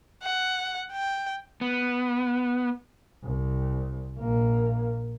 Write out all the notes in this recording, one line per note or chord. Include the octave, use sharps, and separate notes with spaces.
F#5
G5
B3
C2
A#1 A#3